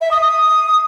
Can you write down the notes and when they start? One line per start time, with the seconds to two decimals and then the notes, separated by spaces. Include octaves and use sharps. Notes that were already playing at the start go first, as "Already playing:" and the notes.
0.01 E5
0.11 D#6
0.21 D#6